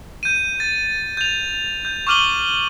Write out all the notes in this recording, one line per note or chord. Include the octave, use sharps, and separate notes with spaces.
G6 D#7
A6
G6 F7
G6
C#6 D6 F6 D#7 F#7 G7